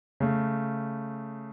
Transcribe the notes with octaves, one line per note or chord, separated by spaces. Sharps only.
C#3 A3